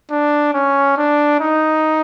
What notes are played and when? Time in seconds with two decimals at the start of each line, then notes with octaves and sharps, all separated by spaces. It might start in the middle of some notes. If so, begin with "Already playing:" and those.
0.11 D4
0.54 C#4
0.97 D4
1.40 D#4